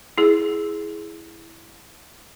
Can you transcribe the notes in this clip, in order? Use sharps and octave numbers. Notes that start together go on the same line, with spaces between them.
E4 G#4